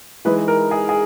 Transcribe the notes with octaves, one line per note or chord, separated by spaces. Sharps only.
E3 G#3 D#4 B4
A#4
G#4
G#4